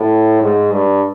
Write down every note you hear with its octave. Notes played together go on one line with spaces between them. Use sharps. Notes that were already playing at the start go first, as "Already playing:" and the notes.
Already playing: A2
G#2
G2